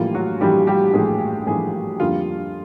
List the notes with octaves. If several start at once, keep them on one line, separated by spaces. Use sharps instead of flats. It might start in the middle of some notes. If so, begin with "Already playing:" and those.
Already playing: A#1 A2 E3 G3 A#3 F4
F#3 F#4
A#1 A2 E3 G3 A#3 G4
G3 G4
A#1 A2 E3 G3 G#3 A#3 G#4
A#1 A2 E3 G3 G#3 A#3 G#4
F2 D3 G3 A#3 F4